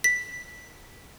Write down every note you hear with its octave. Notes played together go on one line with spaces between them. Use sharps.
B6